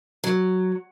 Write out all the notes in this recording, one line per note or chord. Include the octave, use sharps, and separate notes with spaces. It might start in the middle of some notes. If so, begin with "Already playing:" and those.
F#3